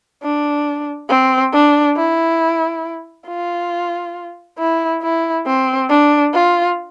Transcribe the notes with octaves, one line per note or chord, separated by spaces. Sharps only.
D4
C4
D4
E4
F4
E4
E4
C4
D4
F4